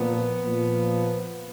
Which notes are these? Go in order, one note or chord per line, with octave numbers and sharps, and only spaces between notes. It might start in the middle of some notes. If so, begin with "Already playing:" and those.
Already playing: A#2 F3 B3
A#2 F3